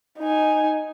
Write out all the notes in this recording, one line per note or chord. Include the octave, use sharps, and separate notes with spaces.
D#4 G#5